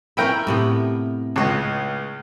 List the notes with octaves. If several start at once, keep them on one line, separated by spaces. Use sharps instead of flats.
C#4 E4 A#4 E5 G5 B5
A2 C3 B3
C#2 B4 C#5 D#5